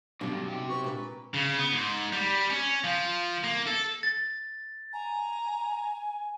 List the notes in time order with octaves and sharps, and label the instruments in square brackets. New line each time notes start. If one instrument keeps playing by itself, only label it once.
[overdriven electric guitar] G2 D3 [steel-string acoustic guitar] B2 G3 [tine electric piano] F#3 C#4 D#4
[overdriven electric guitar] G2
C3 G4
[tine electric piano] F#4 B4 C5 [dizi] C#6
[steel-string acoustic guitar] A#2 [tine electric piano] G#3 C4 D4 [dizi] B4
[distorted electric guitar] C#3
B3
G#2
G3
C#4
F3
A#3
A4
[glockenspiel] A6
[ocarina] G#5 [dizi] A#5